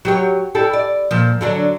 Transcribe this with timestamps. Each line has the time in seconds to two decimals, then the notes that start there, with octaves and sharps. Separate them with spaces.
0.05 F#3 G4 C#5
0.55 G3 E4 A4
0.73 D5
1.11 A#2 F3
1.41 D3 F#3 D4